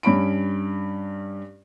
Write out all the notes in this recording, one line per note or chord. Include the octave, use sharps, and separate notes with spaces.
G2 C#4 B5 D7